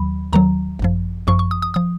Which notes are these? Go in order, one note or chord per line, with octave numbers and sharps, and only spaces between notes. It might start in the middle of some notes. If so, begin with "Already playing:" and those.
Already playing: D#2 D#3 F#3 B5
D#2 D#3 F#3 A#5
G#1 F#2 F3
G#1 F#2 F3 C#6
C#6
D#6
D#6
F3 D#6